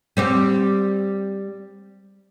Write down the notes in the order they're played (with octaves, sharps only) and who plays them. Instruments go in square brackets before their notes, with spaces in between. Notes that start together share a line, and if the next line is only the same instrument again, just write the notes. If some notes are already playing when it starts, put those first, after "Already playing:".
[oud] G3 C4 G4